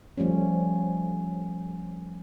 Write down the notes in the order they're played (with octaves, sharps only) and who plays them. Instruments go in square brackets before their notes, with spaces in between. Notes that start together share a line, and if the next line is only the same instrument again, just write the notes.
[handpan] F3 G3 A3 C#4